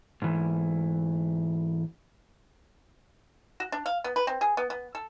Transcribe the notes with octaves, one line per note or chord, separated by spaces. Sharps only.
G#2 E3
F#4
D4
F5
B3
B4
C4
G#4
B3
B3
A4